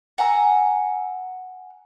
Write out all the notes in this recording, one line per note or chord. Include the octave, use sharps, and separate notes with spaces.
F#5 G#5 A#5 E6